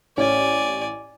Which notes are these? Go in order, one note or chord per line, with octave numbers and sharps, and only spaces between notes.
A1 C#4 D5 G#5